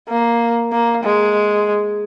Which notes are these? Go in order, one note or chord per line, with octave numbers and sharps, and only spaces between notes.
A#3
A#3
G#3